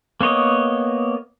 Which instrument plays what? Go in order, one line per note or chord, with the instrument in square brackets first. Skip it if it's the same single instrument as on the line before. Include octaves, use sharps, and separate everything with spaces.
[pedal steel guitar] A#3 B3 C#5 D#5